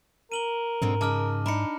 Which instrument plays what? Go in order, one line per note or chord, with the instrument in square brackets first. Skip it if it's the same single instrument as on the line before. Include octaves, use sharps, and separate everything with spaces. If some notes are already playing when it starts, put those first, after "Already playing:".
[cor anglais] A#4 [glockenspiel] D#7 F#7 G7
[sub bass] G#2 [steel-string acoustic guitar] B2 D3 C4
[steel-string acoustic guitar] C#3 D#4 [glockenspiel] A5 D6 F6
[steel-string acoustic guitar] D4 D#4 [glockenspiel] A#5 B5 C#7